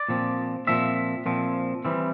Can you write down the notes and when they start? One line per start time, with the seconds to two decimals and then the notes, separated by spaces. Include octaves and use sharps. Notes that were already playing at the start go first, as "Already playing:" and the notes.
Already playing: D5
0.09 A#2 F3 C4
0.67 A#2 F3 C4 E5
1.26 A#2 F3 C4
1.85 E3 G3 C4